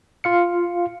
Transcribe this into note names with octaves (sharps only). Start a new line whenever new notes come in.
F4 F5 C#7